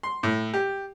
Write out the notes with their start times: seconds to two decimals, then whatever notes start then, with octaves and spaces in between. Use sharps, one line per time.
0.03 C6
0.23 A2
0.54 G4